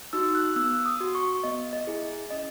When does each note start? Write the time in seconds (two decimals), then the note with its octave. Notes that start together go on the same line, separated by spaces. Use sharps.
0.13 D#4 F#4 E6
0.35 F#6
0.56 B3 E6
0.86 D#6
1.00 F#4
1.15 C#6
1.43 B3 D#5
1.73 D#5
1.87 E4 G#4
2.31 C#4 D#5